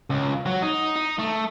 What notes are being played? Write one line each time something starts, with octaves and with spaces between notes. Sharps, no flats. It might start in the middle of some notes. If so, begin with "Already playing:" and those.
C#2
F#3
D#4
D#4
A3